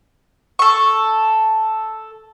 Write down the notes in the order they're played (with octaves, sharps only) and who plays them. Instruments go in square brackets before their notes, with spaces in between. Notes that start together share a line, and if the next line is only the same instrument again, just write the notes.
[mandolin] A4 C#6